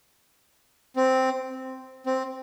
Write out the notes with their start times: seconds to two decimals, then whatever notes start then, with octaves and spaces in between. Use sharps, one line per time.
0.96 C4
2.06 C4